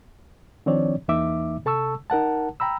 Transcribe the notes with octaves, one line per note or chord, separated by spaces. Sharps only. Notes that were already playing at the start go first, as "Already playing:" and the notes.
D#3 F3 C4 D4 C#5 D5
E2 E3 A#3 D#4 E5 D6
C3 A4 A5 C#6 E6
D#4 A#4 F#5 A5
G5 A#5 B5 E6